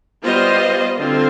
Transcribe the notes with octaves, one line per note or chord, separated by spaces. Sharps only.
G3 B3 F4 C5 D#5
D3 G3 C4 F4 C5